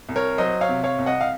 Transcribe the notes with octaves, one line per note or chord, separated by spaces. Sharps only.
C2
A#4 C#5
F#3 C5 D#5
C#5 F5
C3
C#5 F5
C2
D#5 F#5
F5